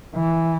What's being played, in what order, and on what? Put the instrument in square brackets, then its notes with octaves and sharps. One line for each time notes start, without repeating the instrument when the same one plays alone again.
[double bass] E3